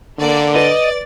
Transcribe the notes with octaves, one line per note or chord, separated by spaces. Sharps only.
D3 A#3 D5
B4 D5 D#5 A6